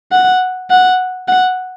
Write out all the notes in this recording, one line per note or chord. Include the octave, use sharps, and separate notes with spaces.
F#5
F#5
F#5